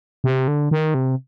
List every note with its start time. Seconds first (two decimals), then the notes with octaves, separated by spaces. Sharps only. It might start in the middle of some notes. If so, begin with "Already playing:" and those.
0.24 C3
0.48 D3
0.71 D#3
0.94 C3